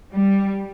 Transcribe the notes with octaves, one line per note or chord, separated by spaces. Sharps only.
G3